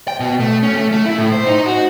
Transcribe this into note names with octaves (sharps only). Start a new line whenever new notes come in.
G5
B2
A3
C#4
A3
A3
E4
A2
C5
D#4
F#4